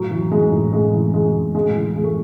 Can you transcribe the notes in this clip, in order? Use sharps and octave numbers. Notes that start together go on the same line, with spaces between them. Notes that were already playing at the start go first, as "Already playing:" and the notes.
Already playing: A2 F#3
E3
E3 G#3
A2
A2 G#3
E3
E3 G#3
A2
A2 G#3
E3
E3 G#3
A3